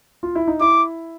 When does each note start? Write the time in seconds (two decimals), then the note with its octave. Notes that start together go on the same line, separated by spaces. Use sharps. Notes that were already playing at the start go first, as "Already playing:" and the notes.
0.23 F4
0.35 E4
0.47 D#4
0.61 E4 D6